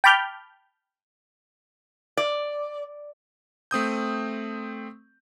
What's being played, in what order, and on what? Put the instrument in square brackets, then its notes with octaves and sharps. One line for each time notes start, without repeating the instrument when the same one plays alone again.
[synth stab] G5 A5 B5 D6 F6 G6
[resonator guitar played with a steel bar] D5
[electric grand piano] A3 C4 D#6 G6